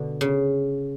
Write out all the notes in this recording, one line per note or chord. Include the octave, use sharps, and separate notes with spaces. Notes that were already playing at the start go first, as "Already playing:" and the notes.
Already playing: B2 D3
C#3